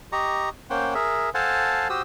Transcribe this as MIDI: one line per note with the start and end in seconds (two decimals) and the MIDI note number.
0.12 0.49 67
0.12 0.49 75
0.12 0.49 82
0.12 0.49 85
0.70 0.94 58
0.70 0.94 61
0.70 0.94 72
0.70 0.94 78
0.70 0.94 79
0.95 1.30 68
0.95 1.30 70
0.95 1.30 76
1.34 1.88 69
1.34 1.88 72
1.34 1.88 77
1.34 1.88 78
1.34 1.88 80
1.34 1.88 81
1.90 2.02 66
1.90 2.02 67
1.90 2.02 72
1.90 2.02 87
1.90 2.02 88